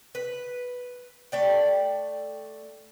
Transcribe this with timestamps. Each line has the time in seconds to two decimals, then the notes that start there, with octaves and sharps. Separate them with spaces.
0.15 B4
1.32 A3 D5 G5